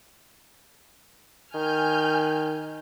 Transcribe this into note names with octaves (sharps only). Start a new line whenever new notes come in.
D#3 G#5 F6 G6